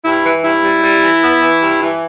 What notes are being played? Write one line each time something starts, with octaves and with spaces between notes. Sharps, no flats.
G2 E4
E3
G2 E4
G3
G3
E3
B3
E3
G2
E3